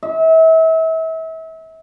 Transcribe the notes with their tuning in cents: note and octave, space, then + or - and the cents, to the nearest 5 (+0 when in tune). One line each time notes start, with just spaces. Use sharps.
E5 -35